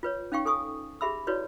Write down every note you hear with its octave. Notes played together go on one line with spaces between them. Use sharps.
F4 B4 C#5
C#4 D#4 F5 G5 C#6
A4 G#5 C#6 D#6
G4 G#4 E5 B5 E6
E4 F#4 B4 C#5 D5